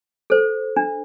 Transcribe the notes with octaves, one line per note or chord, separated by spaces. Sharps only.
A4 C5
D4